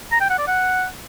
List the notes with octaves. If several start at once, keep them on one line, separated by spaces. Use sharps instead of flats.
A#5
G5
F#5
D5
F#5